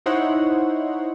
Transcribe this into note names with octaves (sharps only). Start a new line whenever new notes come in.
D#4 E4 C5 C#5 F#5